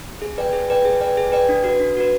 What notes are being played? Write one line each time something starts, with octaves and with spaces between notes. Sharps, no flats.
G#4
B4 D5 G5
G#4
B4 D5 G5
G#4
B4 D5 G5
G#4
B4 D5 G5
D4
F#4 B4
D4
F#4 B4